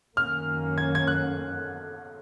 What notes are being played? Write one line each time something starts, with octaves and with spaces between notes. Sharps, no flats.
F#2 D#3 A#3 C#4 F6
G#6
G#6
F#6